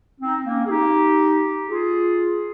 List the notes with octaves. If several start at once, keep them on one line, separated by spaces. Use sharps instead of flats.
C4 D#4
A#3 C#4
G#4
D#4 G4
F4 G#4